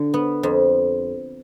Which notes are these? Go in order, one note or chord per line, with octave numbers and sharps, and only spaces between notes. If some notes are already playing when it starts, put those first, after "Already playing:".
Already playing: D3
B3
F2